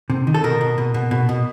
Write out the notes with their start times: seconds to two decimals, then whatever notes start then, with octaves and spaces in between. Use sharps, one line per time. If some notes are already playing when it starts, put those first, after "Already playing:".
0.10 C3
0.27 D#3
0.34 A4
0.44 B2 A#4
0.61 B2
0.78 B2
0.94 B2
1.11 B2
1.29 B2